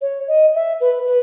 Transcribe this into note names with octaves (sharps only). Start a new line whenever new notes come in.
C#5
D#5
E5
B4
B4